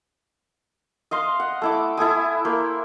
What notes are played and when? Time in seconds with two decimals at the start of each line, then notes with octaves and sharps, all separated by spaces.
1.11 D#5 F5 C6
1.40 F#5
1.62 A3 E4 D6
1.97 E4 A4 G#5 D#6
2.45 A#3 C5